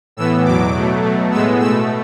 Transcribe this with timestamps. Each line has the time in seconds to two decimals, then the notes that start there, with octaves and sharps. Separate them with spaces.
0.17 A2 E3 B3 E6
0.45 E2 B2 F#3 D6
0.74 B2 F#3 A3
1.03 B2 F#3 A3
1.31 A2 G#3 B3 E6
1.60 B2 A3 E6